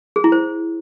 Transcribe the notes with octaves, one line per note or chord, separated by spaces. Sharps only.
G#4
E4
C5